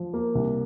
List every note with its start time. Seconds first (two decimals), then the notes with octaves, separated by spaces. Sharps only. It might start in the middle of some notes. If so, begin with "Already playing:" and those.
Already playing: F3
0.14 A#3
0.35 C2